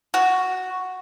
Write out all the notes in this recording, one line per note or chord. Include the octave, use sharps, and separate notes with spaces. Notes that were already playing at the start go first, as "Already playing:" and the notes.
F#4